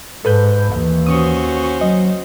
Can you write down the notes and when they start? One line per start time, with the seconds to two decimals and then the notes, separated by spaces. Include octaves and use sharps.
0.25 G#2 A4 B4 G6
0.72 D#2 E3
1.06 C#4 F#4 C5 C#6 D#6
1.81 F#3 D#5